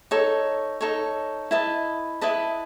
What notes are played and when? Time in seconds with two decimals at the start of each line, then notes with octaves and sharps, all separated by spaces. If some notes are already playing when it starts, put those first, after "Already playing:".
0.11 D#4 A4 C#5
0.81 D#4 A4 C#5
1.51 E4 B4 D#5 A5
2.21 E4 B4 D#5 A5